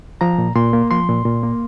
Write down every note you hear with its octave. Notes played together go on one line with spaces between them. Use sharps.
F3 A#5
A#2
A#2 C6
A#3
F3 C6
A#2
A#2
A#3